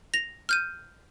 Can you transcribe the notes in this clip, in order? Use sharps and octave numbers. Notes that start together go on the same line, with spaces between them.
A#6 F7
F6 G6 D#7